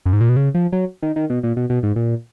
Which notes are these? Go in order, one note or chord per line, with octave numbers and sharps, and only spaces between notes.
F#2
G#2
A#2
B2
C#3
F3
F#3
D#3
D#3
B2
A#2
B2
B2
G#2
A#2